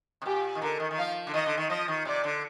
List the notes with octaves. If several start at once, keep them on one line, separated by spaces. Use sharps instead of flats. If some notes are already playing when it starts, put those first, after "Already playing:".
C3
A#2 G4
D#3
D3 A#4
D#3
D#3
F3 F5
D3
D#3 D#5
D3
D#3
F3 D#5
D#3
C3 D5
D3